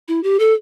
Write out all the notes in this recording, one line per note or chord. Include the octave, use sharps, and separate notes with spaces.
E4
G4
A4